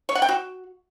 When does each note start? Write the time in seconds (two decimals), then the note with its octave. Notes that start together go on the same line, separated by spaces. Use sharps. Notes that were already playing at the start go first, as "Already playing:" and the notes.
0.09 C#5
0.15 F#5
0.22 G5
0.29 F#4